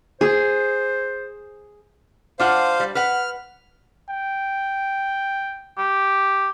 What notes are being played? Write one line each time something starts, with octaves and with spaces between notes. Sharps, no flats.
G#4 C5
D4 F4 C5 F5 F#5
G3
B4 F#5 F6
G5
G4